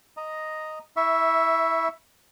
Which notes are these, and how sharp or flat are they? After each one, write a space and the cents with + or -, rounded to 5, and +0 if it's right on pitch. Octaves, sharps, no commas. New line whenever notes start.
D#5 +0 A#5 +0
E4 -20 E5 +0 C#6 +0